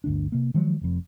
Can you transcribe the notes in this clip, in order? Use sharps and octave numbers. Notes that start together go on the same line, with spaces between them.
G1 D2 D4
C3 A#3
D#3 F3 F#3 G#3
F1 F2